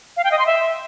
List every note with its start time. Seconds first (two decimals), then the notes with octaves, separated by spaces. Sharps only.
0.17 F5
0.24 G5
0.31 D#5
0.39 C6
0.46 E5